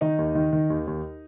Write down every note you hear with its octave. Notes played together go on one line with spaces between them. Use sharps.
D#3 D#4 D#5
D#2
D#3
D#3
D#2
D#2